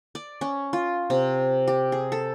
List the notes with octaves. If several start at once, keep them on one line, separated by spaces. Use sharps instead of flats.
D5
C#4
F4
C3
G4
G#4
A4